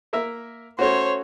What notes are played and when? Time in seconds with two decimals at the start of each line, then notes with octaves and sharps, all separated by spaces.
0.13 A#3 A#4 E5
0.79 A3 C#4 F#4 C5 C#5